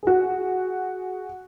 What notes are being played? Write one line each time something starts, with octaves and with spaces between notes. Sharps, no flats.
F#4 G#4